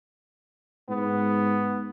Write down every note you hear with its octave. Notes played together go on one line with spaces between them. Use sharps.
G#2 B3